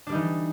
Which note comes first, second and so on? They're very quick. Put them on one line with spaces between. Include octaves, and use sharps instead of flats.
D4 G3 D#4 E3